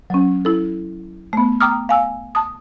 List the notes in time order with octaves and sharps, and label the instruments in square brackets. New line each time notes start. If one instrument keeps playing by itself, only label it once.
[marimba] F#3 C#4
E4 A4
A3 B3
G5 A#5 D6 D#6 F6
F5 G#5 E6
A5 D#6